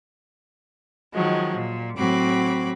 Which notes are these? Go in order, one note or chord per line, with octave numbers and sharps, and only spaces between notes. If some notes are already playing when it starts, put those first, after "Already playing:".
D#3 F3 F#3 G#3
A#2
A2 F#3 C4 F#4 B5 D6